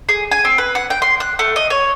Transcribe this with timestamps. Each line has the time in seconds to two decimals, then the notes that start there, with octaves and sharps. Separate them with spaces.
0.09 G#4
0.31 G#5
0.45 C4
0.58 B4
0.75 F#5
0.90 G5
1.02 C6
1.20 F#6
1.39 A3
1.56 D#5
1.70 C#5